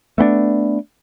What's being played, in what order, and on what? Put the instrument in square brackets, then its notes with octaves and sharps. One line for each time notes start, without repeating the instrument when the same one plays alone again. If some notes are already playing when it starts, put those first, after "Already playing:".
[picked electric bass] A3 B3 C#4 D4